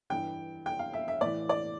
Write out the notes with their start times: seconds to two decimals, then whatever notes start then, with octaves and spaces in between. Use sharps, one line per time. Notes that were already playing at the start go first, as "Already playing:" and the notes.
0.10 G2 E3 G5
0.66 G5
0.79 F5
0.93 E5
1.08 E5
1.21 A2 E3 D5
1.49 D5